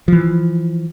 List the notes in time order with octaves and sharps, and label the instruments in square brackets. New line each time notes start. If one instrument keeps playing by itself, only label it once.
[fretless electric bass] E3 F3